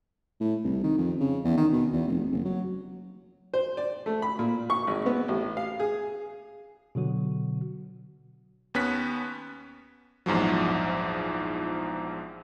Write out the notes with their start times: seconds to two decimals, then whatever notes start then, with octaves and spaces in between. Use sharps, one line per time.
0.40 A2
0.64 C2
0.83 D#3
0.98 F2
1.20 C#3
1.44 E2
1.57 D#3
1.72 B2
1.93 E2
2.07 F1
2.32 F#1
2.45 F#3
3.54 C5
3.77 D5
4.06 A3
4.22 B5
4.39 A#2
4.70 C#6
4.87 G#1
5.06 B3
5.28 A1
5.57 F5
5.80 G#4
6.95 B2 D3 F#3 F#4
8.74 D#2 B3 C#4 F#6 B6
10.26 A#1 E2 G#2 F3 F#3